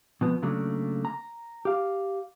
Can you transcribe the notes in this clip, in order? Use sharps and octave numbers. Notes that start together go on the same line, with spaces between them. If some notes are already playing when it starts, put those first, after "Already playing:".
B2 F3 B3
C#3 F#3 A3 A#3 D4
A#5
G4 F5